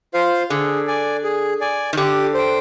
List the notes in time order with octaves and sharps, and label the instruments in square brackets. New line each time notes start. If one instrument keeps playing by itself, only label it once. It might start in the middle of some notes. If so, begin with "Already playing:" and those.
[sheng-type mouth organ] F4 C5 F5
[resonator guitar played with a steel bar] D3 [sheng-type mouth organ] G#4
[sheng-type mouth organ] D5 G#5
G#4
D5 G#5
[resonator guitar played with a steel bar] D#3
[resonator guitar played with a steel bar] D3 [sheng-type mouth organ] G4
[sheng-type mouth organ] C5 G5